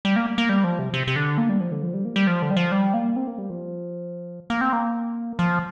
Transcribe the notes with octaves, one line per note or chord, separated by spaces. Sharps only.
G3
A#3
A#3
G3
F3
C3
C3
C3
D3
A#3
G3
F3
D3
F3
G3
A#3
G3
F3
D3
G3
F3
G3
A#3
C4
A#3
G3
F3
A#3
C4
A#3
F3